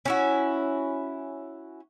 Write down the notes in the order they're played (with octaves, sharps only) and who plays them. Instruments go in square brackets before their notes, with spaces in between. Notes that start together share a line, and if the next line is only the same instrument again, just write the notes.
[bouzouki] C#4 E4 F#4